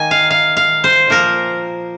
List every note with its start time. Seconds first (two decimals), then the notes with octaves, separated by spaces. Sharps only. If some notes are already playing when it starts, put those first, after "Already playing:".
Already playing: D#3 A#3 G#5
0.11 F5
0.30 F5
0.57 F5
0.84 C5
1.07 A#2 F3 A#3 A#4